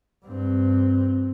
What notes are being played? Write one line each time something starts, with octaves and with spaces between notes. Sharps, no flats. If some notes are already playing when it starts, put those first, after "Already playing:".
G2 C4